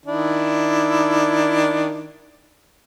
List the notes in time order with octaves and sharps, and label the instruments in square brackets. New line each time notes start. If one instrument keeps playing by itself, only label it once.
[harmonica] D#3 D4 E4